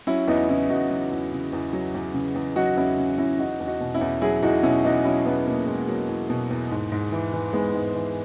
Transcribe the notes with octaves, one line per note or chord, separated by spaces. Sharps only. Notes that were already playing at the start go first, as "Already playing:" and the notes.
F#3 C#4 E4
E2 B3 D#4
C#3 C#4 E4
E2 D#4 F#4
F#3
E2
C#3
E2
F#3
E2
C#3
E2
F#3 D#4 F#4
E2 C#4 E4
C#3
E2 C#4 E4
F#3 D#4 F#4
E2
D#4 F#4
B2
C#4 E4
E2
F#3 E4 G#4
E2 D#4 F#4
B2 C#4 E4
E2 D#4 F#4
F#3 C#4 E4
E2 B3 D#4
B2 A#3
E2 G#3
F#3 A#3
E2
B2
E2
G#2
G#2
E3
E3
G#2 G#3 B3
G#2
E3